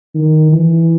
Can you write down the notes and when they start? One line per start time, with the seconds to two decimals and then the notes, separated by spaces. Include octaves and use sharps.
0.14 D#3
0.52 E3